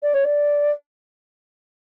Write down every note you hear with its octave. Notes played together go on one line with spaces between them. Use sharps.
D5
C#5
D5